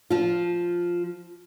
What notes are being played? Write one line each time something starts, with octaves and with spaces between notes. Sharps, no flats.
F3 F4